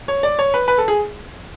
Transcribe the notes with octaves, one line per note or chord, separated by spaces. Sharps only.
C#5
D5
C#5
B4
B4
A4
G#4